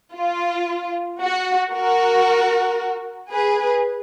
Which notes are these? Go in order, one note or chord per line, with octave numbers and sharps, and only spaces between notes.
F4
F#4
F#4 A#4
G#4 B4